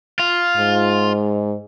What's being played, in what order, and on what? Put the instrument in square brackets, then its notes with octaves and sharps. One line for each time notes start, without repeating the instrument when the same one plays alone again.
[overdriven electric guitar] F4
[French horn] G#2